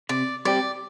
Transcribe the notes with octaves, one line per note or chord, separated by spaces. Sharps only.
C3 D5
G3 C4 G4 D5